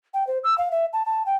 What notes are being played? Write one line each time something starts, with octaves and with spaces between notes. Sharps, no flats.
G5
C5
E6
F5
E5
A5
A5
G5